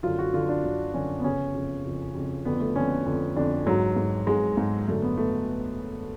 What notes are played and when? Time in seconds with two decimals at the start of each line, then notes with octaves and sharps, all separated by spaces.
0.03 F#2 D3 F4
0.19 F#4
0.34 F#2 D3 F4
0.49 D4
0.64 F#2 D3
0.94 F#2 D3 C#4
1.20 B3
1.24 F2 C#3 C#4
1.55 F2 C#3
1.85 F2 C#3
2.15 F2 C#3
2.45 F2 D3 B3
2.60 A3
2.76 F2 D3 C#4
3.06 F2 D3
3.36 F2 D3 D4
3.67 G#2 F#3
3.97 G#2
4.27 G#2 G#3
4.57 G#2
4.87 F#2 D3 A3
5.02 B3
5.17 D3 A3